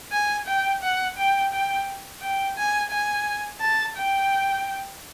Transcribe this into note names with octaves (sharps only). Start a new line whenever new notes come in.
G#5
G5
F#5
G5
G5
G5
G#5
G#5
A5
G5